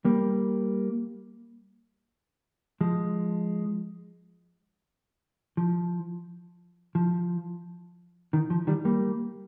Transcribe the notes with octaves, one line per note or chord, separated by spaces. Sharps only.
G3 A#3
F3 G#3
F3
F3
D#3
F3
D#3 G3
G3 A#3